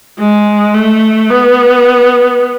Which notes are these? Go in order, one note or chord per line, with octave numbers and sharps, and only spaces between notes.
G#3
A3
B3